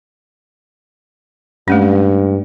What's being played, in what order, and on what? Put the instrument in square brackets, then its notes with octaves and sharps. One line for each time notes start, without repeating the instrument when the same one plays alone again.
[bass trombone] G2 [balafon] G#3 A3 C#4